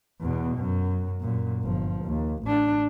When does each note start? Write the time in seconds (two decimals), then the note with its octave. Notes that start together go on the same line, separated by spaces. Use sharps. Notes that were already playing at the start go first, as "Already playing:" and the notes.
0.21 E2 B2
0.58 F#2
1.20 F#2 A#2
1.63 G1 F3
2.05 D#2
2.44 A1 D4